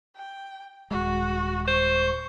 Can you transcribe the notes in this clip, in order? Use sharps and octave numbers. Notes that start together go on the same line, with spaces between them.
G5
D#1 G#3 F#4
C5 C#6